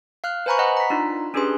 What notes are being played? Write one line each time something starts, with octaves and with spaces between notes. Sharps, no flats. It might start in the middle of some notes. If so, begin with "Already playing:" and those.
F5 F6 F#6
B4 C5 G#5 A#5 B5 C#6
D#5 F#5 B5 C#6
A#5 B6
D4 D#4 F4
C#4 D4 G4 G#4 B4 C6